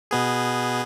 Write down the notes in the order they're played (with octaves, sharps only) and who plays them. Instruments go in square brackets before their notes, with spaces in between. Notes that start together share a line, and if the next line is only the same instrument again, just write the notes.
[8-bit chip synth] B2 B3 G#4